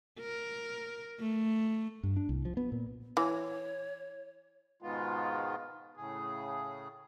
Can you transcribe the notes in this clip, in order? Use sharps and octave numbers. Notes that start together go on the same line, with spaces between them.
A#4
A3
G2
D4
C2
F3
B3
A#2
E3 C#5
G#2 B2 D#3 G#3 B3 F4
A2 C#3 G#4